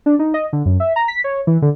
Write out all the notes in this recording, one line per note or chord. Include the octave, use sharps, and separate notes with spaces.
D4
D#4
D#5
D3
F#2
E5
A#5
B6
C#5
E3
D3